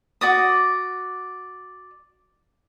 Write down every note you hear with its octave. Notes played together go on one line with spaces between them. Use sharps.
F#4 D5 D#6